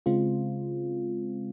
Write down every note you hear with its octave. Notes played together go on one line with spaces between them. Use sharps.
C#3 G#3 C4 F4